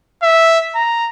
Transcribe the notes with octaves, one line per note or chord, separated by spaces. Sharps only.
E5
A#5